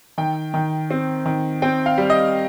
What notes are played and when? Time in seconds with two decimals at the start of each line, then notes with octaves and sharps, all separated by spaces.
0.18 D#3 G5
0.54 D#3
0.91 C4
1.26 D#3
1.62 C4 G5
1.86 F5
1.98 G3
2.10 D#5